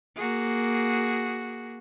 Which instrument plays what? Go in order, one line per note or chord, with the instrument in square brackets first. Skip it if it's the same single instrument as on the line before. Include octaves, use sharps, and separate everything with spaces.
[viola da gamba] A#3 F#4 G#4